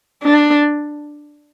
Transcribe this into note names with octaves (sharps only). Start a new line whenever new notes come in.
D4